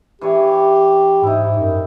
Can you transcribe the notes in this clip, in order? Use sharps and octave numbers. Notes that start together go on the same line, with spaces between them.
E3 D4 G4 C#5
G#2 D#4 E4
F#2